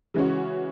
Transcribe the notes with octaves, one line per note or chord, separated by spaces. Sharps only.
C#3 E3 G#3 C#4 F#4